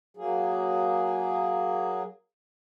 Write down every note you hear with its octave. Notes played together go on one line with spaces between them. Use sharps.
F#3 A#3 G#4